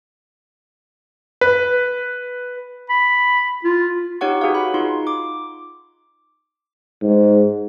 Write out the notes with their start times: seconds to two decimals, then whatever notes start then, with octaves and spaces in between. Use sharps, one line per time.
1.41 B4
2.89 B5
3.64 F4
4.21 D#4 G4 C#5 F#5 C#6
4.41 F#4 G#4 B4 F5
4.54 F#5 B5
4.74 D#4 F4 C6
5.07 D6
7.01 G#2